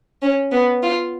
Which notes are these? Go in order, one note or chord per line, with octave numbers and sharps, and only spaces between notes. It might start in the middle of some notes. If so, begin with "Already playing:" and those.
C#4
B3
F4